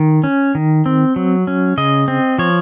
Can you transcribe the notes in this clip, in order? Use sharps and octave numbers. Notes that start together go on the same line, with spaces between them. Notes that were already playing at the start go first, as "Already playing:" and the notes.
Already playing: D#3
C#4
D#3
C4
F#3
C#4
C#3 D#5
C4
F3 C#5